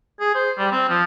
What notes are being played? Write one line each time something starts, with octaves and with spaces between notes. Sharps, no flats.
G#4
C5
G3
C4
F3